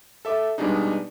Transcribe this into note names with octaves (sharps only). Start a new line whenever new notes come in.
A4 E5 D6
G2 B2 G3 G#3 D4 D#4